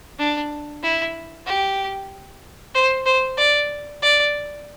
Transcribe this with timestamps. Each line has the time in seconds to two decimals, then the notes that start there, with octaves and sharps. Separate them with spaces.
0.19 D4
0.83 E4
1.46 G4
2.75 C5
3.06 C5
3.37 D5
4.02 D5